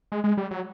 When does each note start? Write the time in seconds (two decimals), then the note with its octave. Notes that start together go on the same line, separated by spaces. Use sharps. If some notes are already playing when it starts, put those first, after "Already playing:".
0.12 G#3
0.24 G#3
0.37 G3
0.51 F#3